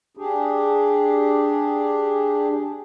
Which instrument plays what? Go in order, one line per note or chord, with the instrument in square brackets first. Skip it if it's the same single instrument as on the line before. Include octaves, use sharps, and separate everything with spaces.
[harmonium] D4 G4 G#4